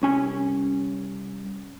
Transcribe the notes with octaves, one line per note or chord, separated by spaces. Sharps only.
C2 C#4 G#5